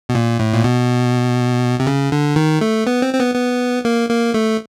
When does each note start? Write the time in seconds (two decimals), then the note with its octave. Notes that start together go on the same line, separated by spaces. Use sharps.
0.09 B2
0.15 A#2
0.40 A2
0.54 A#2
0.64 B2
1.80 C3
1.87 C#3
2.12 D3
2.36 D#3
2.61 A3
2.87 B3
3.02 C4
3.14 C4
3.19 B3
3.35 B3
3.85 A#3
4.09 A#3
4.34 A3